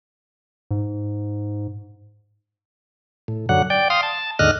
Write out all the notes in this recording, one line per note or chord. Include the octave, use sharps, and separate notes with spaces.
G#2
A2
F#2 D3 F#3 F#5
D5 G5
F5 C6 D#6
A5
D#2 G#2 D3 D#5 F6 F#6